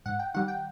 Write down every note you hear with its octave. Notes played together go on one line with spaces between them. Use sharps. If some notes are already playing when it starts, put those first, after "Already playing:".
G#2 F#5
G5
D#3 G3 F#5
G5